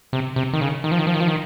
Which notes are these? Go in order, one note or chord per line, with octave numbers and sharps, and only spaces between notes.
C3
C3
D#3
C#3
D#3
F3
D#3
F3
D#3
F3
D#3